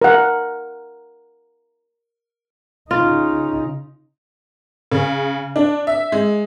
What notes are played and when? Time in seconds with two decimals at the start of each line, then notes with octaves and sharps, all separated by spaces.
0.02 A#4 F#5
2.91 C#3 D#4 F4
4.92 C#3
5.56 D4
5.87 E5
6.12 G#3